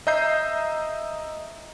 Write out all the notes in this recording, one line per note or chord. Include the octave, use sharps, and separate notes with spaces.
D#5 E5 A#5 G6 C7